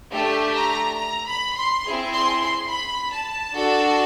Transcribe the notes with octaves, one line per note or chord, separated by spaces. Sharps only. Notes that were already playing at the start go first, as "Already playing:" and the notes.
A3 D4 G4
A#5
A#5
B5
C6
C4 E4 G#4
C6
C6
B5
A5
D4 F#4 A4